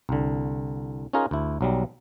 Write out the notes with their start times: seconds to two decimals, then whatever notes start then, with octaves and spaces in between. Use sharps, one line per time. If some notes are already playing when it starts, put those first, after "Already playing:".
0.09 C2 D3
1.13 C#4 D#4 F4 G#4 A#4
1.31 D2 E4
1.61 B1 F#3 G3